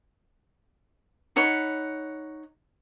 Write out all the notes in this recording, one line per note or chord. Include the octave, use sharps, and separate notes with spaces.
D#4 C#5 F#5 B5